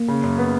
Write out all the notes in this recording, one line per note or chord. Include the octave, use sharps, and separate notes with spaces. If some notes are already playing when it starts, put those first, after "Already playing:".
Already playing: A#3
C#3
F#2
B3